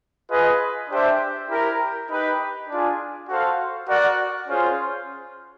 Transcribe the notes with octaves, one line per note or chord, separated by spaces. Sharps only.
F4 G#4 B4 D#5
D4 G4 C5 E5
E4 G4 A#4
D#4 G4 B4
D4 F4 G#4
F#4 A4 C5 F5
F#4 A#4 D5 F#5
C#4 F4 G#4 C5